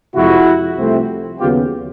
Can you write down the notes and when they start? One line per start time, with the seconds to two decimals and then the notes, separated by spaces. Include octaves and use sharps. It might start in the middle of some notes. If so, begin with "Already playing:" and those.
0.14 F2 C3 F3 G#3 E4 F#4
0.77 C2 C3 F3 A3 C4
1.39 D#2 C#3 F#3 B3 F4 G4